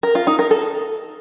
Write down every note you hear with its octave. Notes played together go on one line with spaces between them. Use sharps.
A#4
F4
D#4
A#4
A4